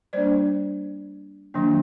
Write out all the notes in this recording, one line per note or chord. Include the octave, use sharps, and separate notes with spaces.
G3 A#3 D4 C5 D5
D#3 F#3 A#3 D4